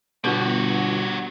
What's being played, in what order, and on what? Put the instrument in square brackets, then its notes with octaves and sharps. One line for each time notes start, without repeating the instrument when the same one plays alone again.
[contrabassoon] G1 [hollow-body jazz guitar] B2 [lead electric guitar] G3 F#4